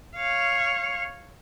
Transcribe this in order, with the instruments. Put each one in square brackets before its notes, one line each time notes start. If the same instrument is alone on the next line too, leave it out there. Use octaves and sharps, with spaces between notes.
[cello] C#5 F5